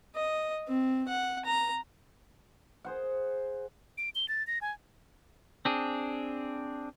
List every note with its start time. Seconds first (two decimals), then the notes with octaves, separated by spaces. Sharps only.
0.16 D#5
0.68 C4
1.08 F#5
1.46 A#5
2.84 G#4 C5 F#5
3.98 D7
4.15 G7
4.28 A6
4.47 A#6
4.61 G#5
5.65 C4 D4 G#4